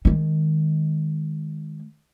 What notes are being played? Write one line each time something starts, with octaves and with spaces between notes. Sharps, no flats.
D#3 G#3